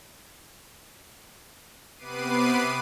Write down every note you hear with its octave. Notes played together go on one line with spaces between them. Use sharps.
C3 B3 B4 D6 C7 D#7